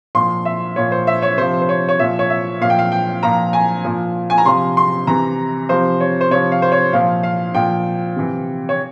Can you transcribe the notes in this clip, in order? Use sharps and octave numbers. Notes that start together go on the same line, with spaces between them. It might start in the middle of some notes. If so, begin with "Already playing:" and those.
A#2 F3 C6
E5
A#2 F3 C#5
C5
E5
C#5
C3 F3 C5
C5
C#5
C#5
A#2 F3 E5
C#5
E5
A#2 F3 F5
G5
F5
G5
A#2 F3 A#5
G#5
A#2 F3
G#5
A#5
C3 F3 C6
C6
C3 E3 A#5
C3 F3 C5
C#5
C5
C3 F3 C#5
F5
C5
C#5
A#2 F3 F5
F5
A#2 F3 G5
C3 E3
C#5